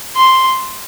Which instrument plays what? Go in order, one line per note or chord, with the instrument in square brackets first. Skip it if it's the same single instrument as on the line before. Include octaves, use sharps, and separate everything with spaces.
[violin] C6